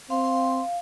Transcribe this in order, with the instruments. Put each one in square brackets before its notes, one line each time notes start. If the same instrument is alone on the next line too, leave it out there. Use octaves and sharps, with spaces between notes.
[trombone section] C4 [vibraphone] F5 [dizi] C6